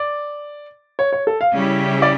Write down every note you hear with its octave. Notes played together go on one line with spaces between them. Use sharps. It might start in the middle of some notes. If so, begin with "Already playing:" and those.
Already playing: D5
C#5
C#5
A4
F5
C#3 G3 C#4 E4 G4
D5